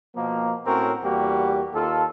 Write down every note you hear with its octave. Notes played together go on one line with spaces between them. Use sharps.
B2 F3 A#3
A2 C4 C#4 F#4 A#4
E2 G3 A#3 F#4 G4
D#2 F4 A4